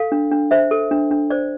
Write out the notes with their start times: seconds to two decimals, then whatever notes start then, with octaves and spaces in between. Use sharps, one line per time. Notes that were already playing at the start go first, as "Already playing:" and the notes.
Already playing: A4 F5
0.12 D4
0.31 D4
0.51 C5 E5
0.71 A4
0.91 D4
1.11 D4
1.30 C5 D5